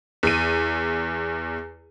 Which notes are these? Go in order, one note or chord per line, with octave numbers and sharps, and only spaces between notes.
E2 D#7